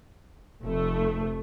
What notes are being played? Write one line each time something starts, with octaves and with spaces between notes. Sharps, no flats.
F1 A3